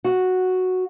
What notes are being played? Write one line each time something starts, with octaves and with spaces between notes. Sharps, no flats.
F#4